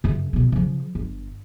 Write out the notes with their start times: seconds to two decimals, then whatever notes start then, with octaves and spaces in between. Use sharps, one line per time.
0.04 F#2 C#3
0.33 B2 B3
0.52 C#3 F3
0.95 G1